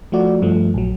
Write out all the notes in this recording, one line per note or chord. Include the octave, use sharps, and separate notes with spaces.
F3 A3 F#4 D5
G2 F3 A3
A#1 F#3